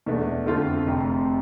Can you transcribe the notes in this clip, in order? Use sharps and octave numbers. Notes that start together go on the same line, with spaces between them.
E2 B2 A3 D4
F2 D3 A3 C4 F4
F1 F2 C3